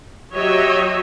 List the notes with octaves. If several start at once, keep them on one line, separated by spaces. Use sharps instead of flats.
F#3 G4 C#5 D#5 E5